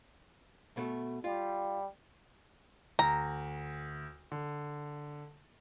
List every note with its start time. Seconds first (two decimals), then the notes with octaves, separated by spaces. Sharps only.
0.77 B2 A3
1.24 G3 F4
2.99 D2 A#5
4.32 D3